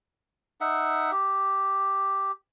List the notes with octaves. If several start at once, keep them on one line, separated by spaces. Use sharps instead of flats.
D#4 E5 F#5
G4